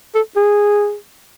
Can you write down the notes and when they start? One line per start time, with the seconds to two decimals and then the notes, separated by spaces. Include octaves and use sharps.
0.15 A4
0.36 G#4